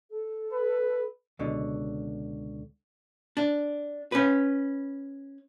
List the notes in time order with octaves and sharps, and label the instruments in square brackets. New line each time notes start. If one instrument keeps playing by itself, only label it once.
[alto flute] A4
[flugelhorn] B4
[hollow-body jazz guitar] C#2 B2 D3
D4
C#4 B4